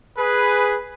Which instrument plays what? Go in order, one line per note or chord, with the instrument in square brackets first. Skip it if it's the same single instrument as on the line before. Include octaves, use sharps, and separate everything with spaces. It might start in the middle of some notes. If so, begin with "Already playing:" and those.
[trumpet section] G#4 B4